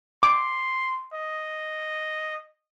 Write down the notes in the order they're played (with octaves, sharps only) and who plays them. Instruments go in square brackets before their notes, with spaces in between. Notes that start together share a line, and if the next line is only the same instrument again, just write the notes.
[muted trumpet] C6 [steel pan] D6
[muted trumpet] D#5